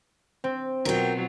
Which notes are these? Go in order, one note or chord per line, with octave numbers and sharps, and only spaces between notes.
C4
B2 F#3 F4 A#4 G5